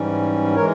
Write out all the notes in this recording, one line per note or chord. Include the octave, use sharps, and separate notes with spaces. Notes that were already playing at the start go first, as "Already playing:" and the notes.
Already playing: G#2 E3 G3 C#4
E3 G#3 A#4 C#5